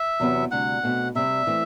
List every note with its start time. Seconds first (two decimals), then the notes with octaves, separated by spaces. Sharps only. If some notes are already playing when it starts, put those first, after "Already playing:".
Already playing: E5
0.20 E2 C3 F#3 B3
0.51 D2 C3 G3 F#5
0.83 B2 A3 C4
1.15 C3 G3 C4 E5
1.47 E3 A3 C4